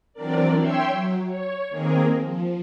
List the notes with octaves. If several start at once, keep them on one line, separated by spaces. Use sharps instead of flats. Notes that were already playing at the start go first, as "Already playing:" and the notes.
E3 F#3 C4 D4 A#4 D5
C#5 E5 G5 C6 E6
F#3
C#5
D#3 A#3 C4 G#4 A#4
F3